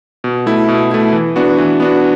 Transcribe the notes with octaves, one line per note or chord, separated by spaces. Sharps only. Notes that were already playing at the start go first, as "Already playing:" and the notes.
B2
A3 E4
B2
A3 E4
E3
B3 D4 F#4
E3
B3 D4 F#4